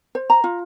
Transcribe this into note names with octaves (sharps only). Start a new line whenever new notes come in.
C5
A#5
F4